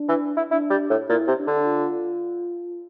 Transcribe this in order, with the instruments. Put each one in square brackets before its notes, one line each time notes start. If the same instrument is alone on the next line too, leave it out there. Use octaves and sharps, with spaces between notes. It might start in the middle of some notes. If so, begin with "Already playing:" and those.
Already playing: [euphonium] D4
[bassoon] E3
E4
[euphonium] D4 [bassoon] E4
[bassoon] G3
A2
[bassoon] A#2 [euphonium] E4
[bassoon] C3
[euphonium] D4
[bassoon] D3
[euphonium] F4